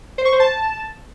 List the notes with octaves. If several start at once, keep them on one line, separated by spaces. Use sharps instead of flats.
C5
C#6
C5
A5